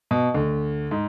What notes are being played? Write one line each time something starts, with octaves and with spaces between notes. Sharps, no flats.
B2
D2
G#2